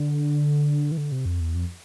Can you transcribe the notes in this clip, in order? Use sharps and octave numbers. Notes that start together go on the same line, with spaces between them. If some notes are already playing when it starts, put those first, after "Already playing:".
Already playing: D3
E3
D3
C3
F2
E2
F2